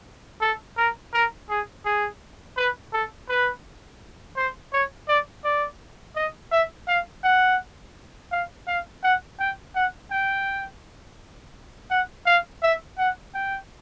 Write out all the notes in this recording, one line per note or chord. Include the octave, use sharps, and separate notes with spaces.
A4
A#4
A#4
G#4
G#4
B4
A4
B4
C5
C#5
D5
D5
D#5
E5
F5
F#5
F5
F5
F#5
G5
F#5
G5
F#5
F5
E5
F#5
G5